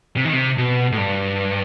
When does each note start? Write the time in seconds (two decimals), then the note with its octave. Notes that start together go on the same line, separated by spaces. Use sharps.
0.17 C3
0.25 D#3
0.33 C3
0.58 B2
0.92 A2
0.98 G2